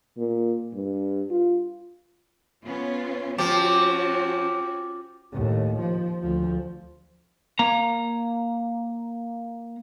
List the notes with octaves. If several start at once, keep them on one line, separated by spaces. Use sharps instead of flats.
A#2
G2
F4
B3 C#4 F4
F3 C#4 F#4 G4
D#2 A2
F3
D2 F3
A#3 A#5